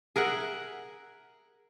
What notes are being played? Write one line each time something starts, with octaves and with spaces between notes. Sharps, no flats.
G#4 A#4 E5 F#5